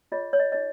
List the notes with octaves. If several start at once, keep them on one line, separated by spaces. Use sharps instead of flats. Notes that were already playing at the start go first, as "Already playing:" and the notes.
F4 G#4 C#5 D#5
C#5
D#5
D#4 G#4 C#5 D#5